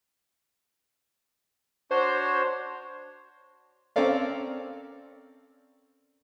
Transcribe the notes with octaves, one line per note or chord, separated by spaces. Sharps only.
D4 F#4 C5 C#5
C4 C#4 A4 A#4 D5 F5